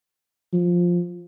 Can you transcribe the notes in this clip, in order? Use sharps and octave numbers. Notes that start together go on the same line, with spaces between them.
F3